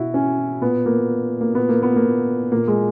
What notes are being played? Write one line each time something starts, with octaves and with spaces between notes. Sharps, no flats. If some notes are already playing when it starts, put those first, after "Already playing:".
Already playing: B2 E4 F#4
C#4
A#2 B3
A#3
A#3
A#2 B3
A#3
B3
A#3
A#2 A#3
G#3